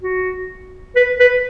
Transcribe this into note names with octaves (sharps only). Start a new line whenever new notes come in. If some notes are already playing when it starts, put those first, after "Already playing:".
F#4
B4
B4